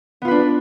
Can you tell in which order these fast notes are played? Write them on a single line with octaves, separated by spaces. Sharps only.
B3 F4 B4 D4